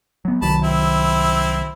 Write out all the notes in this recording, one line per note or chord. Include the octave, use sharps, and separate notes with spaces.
F#3 B3
C2 D#3 F#3 A5 B5
C4 E4